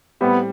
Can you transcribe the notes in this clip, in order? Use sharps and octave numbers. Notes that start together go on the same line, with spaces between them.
A2 G3 B3 C4 E4